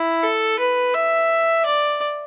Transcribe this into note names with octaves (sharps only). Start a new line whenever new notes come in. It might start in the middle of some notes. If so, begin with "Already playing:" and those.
Already playing: E4
A4
B4
E5
D5